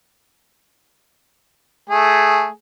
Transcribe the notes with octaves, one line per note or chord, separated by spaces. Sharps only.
A3 G#4